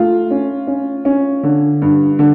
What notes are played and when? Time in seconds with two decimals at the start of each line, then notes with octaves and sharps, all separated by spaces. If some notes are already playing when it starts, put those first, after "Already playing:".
Already playing: A3 F4
0.31 C#4
0.67 C#4
1.05 C#4
1.43 D3
1.82 G2
2.19 D3